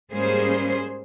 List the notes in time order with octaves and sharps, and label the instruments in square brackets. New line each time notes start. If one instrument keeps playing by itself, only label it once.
[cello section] G#2 G3 A#3 C#4 G#4 C5